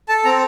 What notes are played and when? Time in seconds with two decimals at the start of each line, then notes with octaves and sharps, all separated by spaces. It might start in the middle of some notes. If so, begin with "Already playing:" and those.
0.09 A4 A5
0.25 C4 A#5